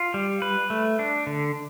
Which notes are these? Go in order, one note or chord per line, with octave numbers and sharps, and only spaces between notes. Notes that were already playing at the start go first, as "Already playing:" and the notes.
Already playing: F4
G3
B4
A3
D4
D3